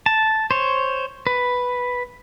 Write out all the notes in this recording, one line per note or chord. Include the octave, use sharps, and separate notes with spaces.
A5
C5 C#5
B4